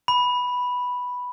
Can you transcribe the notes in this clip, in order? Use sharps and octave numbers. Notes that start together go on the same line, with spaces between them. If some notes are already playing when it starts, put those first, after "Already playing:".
B5